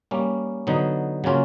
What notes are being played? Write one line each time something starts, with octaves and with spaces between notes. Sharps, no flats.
G3 A#3 C#4
D3 F#3 B3 D#4
C#3 F#3 A#3 C#4 F4